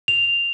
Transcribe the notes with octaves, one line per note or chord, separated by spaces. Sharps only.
F7